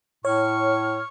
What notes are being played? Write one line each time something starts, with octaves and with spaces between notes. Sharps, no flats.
A2 C#5 C#6 F6